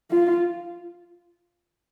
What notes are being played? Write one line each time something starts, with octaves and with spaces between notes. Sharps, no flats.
F4